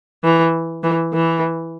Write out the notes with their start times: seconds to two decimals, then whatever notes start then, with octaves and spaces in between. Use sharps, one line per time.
0.24 E3
0.84 E3
1.14 E3